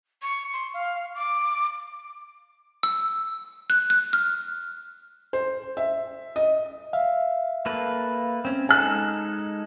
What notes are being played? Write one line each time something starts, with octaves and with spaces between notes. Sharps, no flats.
C#6
C6
F5
D6
E6
F#6
F#6
F6
C5
E5
D#5
E5 F5
A#3 A4 B4
C4 C#4
G#3 D#4 A4 G#5 F#6